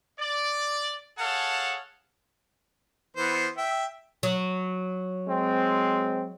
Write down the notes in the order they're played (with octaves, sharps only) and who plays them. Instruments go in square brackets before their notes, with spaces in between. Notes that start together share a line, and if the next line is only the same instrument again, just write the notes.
[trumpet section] D5
G#4 A4 C#5 F5 F#5 A5
[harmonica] E3 B3 C5
E5 G5
[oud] F#3
[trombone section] G#3 C4